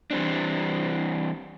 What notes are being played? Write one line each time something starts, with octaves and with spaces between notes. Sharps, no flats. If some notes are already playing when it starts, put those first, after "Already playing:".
E3 G3 C4 D4